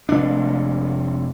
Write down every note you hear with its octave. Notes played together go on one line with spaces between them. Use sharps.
F1 D4